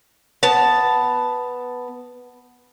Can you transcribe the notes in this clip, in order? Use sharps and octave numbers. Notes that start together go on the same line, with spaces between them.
B3 A5